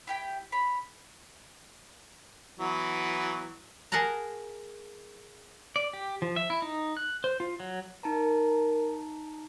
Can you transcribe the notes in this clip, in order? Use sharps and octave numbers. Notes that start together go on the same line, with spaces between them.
E4 G4 G5
C#5 B5
E3 F#3 B3
G#4 A#4 F#5 A5 A#5
D5
G4
F3
E5
E4
D#4
F#6
C5
F4
F#3
D#4 A#4 A5 A#5